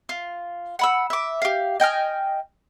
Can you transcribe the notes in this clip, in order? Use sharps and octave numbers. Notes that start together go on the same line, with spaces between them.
F4
F#5 B5 E6
E5 D6
G4 F5
D#5 G5 G#5 F6